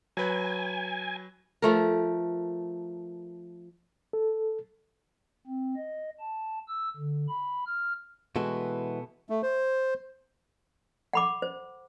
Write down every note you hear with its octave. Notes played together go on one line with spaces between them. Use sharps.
F#3 B4 G#5
F3 A3 A#4
A4
C4
D#5
A5
E6
D3
B5
F6
B2 E3 G#3 B3 F#4 A4
A3
C5
F#5 B5 D6
C5